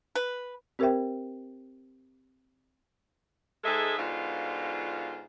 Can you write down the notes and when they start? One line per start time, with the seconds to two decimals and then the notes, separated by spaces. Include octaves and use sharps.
0.15 B4
0.79 C4 G4 A#4 C5 E5 G5
3.64 G#2 G#3 D#4 G#4 A4 E5
3.98 G#2 B2 D3 F4